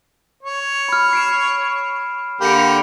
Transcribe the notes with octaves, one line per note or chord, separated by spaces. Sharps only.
C#5
B5 F6
C7 D7 E7
D3 A#3 G4 B5 C#7